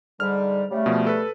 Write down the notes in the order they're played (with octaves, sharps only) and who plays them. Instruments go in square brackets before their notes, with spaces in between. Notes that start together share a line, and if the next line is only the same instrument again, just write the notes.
[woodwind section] G#2 D3 G3 [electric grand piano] F6
[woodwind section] C#3 G3 A3
[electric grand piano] B2 F3
A4 B4